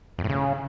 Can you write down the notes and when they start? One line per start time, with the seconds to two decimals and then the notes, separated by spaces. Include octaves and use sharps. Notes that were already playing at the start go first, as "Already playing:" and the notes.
0.19 F2
0.24 A2
0.29 C#3